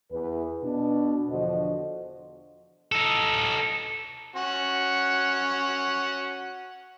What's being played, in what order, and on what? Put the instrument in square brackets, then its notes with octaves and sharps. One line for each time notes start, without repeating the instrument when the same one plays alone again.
[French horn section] E2 B4
B2 D4
E2 D3 F3 F#4 C5 D#5
[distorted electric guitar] D#4 A4
[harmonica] C#4 F#4 F#5